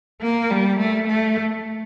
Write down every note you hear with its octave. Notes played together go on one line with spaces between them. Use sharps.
A#3
G3
A3
A3